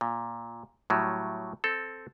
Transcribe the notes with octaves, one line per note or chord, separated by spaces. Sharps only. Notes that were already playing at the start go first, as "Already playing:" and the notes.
A#2
A2 F#3 G3
C4 A4